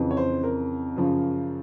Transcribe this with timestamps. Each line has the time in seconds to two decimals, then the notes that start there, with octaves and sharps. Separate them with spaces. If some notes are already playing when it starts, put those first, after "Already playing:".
Already playing: F2 C#3 E3
0.11 C#5
0.17 C5
0.44 A#4
0.96 F#2 C#3 F3